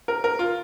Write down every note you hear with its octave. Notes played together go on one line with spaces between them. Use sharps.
A#4
A#4
F4